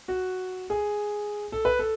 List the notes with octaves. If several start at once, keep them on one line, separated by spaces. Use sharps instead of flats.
F#4
G#4
A4
B4
A4